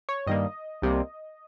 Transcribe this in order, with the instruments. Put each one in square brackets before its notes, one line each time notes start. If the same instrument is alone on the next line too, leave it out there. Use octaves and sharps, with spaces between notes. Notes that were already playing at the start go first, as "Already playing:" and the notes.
[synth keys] C#5
G2 D#3 G3 A#3 D#5
C2 C3 G3 A#3